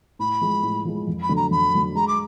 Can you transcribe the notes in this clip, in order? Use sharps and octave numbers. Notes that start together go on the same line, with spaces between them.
A2 B5
F3 G#3
A2
F3 G#3
F2
B5
D3 F#3 A3
A#5
F2 B5
D3 F#3 A3
G#3 A#5
D6